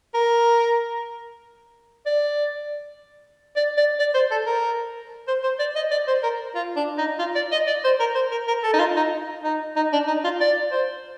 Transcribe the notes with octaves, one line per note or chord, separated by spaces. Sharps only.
A#4
D5
D5
D5
D5
C5
A4
A#4
C5
C5
D5
D#5
D5
C5
A#4
F4
D4
D#4
F4
D5
D#5
D5
C5
A#4
C5
A#4
A#4
A4
D#4
F4
D#4
D#4
D#4
D4
D#4
F4
D5
C5